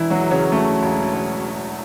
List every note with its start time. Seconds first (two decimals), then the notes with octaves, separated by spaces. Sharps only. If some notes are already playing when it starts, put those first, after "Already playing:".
Already playing: E1 E3 E4
0.10 F#3 F#4
0.21 E2
0.31 C#3 C#4
0.52 C#3 A3
0.83 E1
1.14 E1